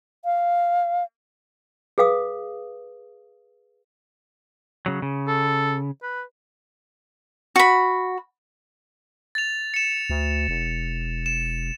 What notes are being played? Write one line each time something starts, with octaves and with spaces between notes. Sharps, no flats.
F5
G#4 B4 F5 D#6
C#3 F#3
C#3
A4
B4
F#4 B5
A6 F7
C#7 E7
D2
E1
E7